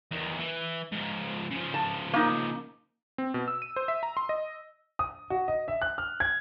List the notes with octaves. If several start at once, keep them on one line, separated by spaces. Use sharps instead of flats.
E2 D#3
E3
G#2 F3
C#3 F3
A5
A#3 D#4
C4
B2
E6
D#7
C5
E5
A#5
C6
D#5
D#6
F#4
D#5
E5
F#6
F6
G#6